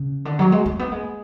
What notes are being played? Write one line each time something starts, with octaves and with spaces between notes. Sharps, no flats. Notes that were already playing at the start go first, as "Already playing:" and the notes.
Already playing: C#3
D3
F#3
G#3
A3
B3
G#3